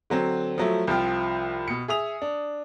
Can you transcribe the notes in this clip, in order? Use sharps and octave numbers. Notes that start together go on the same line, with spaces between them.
D3 F#3 C4
F3 F#3 A3
C2 F3 F4 G5 F6
B2 C#7
G#4 E5 D#6 F7
D4